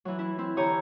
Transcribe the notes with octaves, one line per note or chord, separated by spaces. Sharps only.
E3 F#3
E4
C4 E4
D3 E3 G4 C#5 A#5 D#6